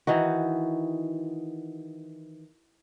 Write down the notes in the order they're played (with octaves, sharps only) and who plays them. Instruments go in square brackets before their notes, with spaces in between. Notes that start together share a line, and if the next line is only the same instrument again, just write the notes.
[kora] D#3 E3 D#4 F#4